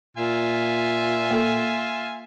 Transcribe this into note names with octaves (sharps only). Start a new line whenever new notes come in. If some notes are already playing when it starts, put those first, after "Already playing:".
A#2 F4 E5 G#5
A#3 A4